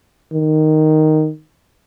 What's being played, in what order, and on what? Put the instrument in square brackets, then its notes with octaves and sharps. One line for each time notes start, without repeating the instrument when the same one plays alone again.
[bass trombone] D#3